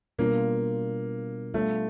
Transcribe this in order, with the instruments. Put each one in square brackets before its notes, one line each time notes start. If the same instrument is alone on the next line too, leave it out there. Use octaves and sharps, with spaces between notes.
[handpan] B2 G3 B3 D4 F4 [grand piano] A#3
[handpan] G3 B3 D4 F4 [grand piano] A3